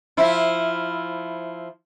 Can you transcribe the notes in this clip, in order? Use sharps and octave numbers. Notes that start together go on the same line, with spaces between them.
F3 E4